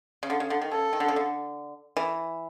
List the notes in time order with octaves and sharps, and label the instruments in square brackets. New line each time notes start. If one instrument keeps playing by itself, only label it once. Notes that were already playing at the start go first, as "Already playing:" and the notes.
[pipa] C#3
D3
C#3
D3
D#3
[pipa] C#3 [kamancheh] A4
[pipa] D#3
D3
C#3
D3
E3